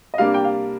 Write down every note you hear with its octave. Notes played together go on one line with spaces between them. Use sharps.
D#5
C3 G3 A#3 D4 F5
G5
F5